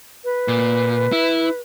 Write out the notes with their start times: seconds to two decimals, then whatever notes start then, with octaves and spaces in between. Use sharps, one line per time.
0.25 B4
0.48 A#2
1.12 E4